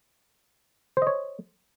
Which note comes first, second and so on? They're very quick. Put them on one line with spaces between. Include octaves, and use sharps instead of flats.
C5 D#5 C#5